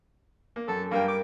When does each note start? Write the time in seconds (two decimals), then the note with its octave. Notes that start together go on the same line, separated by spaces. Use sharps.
0.56 A#3
0.68 F#2 A4
0.91 G2 A#3 A#4 G5
1.08 D6